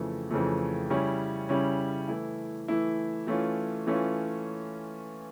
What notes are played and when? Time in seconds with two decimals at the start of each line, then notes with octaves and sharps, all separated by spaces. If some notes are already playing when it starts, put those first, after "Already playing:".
Already playing: F2 C#3 E3 A3
0.31 F2 C#3 E3 A3
0.90 C#3 G3 C#4 E4
1.49 C#3 G3 C#4 E4
2.08 E3 A3 E4
2.68 E3 A3 E4
3.27 E3 A3 C#4 F4
3.87 E3 A3 C#4 F4